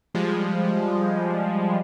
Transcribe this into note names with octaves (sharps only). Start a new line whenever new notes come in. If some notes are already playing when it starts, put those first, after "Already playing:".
F3 G3 G#3